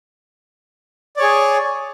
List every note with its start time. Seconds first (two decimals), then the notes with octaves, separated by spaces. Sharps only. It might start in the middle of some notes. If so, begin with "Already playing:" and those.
1.17 D5
1.19 C#5
1.22 G#4